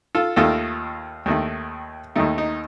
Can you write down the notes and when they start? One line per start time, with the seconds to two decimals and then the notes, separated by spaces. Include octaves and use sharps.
0.15 F4 A4
0.36 D#2 D#3 A3 F4 A4
1.26 D#2 D#3 A3
2.16 D#2 D#3 A3 D#4
2.38 D#4